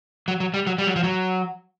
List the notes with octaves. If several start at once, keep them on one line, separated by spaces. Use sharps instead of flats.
F#3
F#3
G3
F#3
G3
F#3
F3
F#3